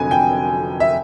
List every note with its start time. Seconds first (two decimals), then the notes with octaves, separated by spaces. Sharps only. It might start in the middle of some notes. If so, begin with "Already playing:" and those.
Already playing: F1 F2 D3 F#3 G#5
0.11 G5
0.80 E5